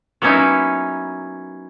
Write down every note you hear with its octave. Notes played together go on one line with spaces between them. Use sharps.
F#3 A#3 B3 C#4 D#4 E4